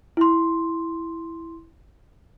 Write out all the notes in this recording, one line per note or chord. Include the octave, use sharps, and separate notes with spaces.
E4 C6